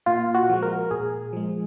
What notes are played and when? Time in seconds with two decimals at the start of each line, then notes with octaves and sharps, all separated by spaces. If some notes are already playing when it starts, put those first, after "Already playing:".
0.06 A#2 F4
0.34 F#4
0.49 F3 G#3
0.62 A#4
0.91 A#2 G#4
1.33 F3 G#3